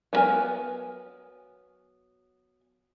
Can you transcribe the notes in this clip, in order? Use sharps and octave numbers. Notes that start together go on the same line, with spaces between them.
F#3 A#3 B3 A#4 G#5